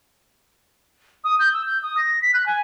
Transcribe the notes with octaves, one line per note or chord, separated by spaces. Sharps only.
D#6
G6
E6
G6
D#6
A#6
B6
F#6
G#5